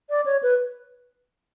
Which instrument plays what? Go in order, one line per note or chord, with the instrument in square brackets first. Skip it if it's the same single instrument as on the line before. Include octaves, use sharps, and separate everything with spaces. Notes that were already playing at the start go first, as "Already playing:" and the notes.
[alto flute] D5
C#5
B4